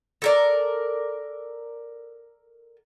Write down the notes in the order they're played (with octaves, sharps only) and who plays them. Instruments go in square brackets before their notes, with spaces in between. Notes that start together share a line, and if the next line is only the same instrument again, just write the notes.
[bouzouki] A4 A#4 D5